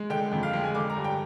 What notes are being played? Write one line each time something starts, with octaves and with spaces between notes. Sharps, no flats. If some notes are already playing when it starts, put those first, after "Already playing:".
Already playing: G#3
D3 G5
F2 G5
F5
G#3 G5
G#5
D3 D6
A#5
G2
G5